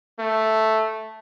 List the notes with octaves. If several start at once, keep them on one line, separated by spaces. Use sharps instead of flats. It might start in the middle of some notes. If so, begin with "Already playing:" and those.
A3